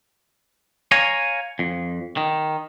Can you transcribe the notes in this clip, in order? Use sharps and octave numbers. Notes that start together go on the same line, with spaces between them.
C#5 F5 G#5 A#5
F2
D#3